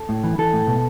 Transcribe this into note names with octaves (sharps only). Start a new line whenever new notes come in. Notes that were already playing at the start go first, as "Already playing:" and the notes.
Already playing: A4
A2
E3
E3 A4
A2
B2